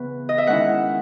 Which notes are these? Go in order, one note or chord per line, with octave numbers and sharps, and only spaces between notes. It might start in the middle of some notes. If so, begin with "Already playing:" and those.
Already playing: C#3 E3 B3 B4
D#5
E5
D#3 G#3 C#4 E4 F#5